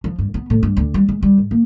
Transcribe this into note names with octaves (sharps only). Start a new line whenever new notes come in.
F3
G2
B3
A2
G2
D2
G3
G#3
G3
G#2
A#3